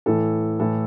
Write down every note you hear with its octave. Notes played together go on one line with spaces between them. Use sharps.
A2 E3 A4
A2 E3 A4